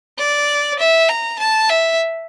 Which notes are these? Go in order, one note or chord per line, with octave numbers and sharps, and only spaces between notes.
D5
E5
A#5
A5
E5